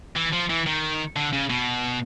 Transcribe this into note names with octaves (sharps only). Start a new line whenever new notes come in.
E3
F3
E3
D#3
D3
C#3
B2